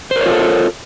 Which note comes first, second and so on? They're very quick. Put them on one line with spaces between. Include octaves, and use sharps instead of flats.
C5 A#4 C#5 F4 A4